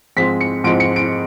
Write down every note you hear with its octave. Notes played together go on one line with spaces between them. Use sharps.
G#2 F3 G#3 C4 B6
C#7
G#2 F3 G#3 C4 D7
C#7
D7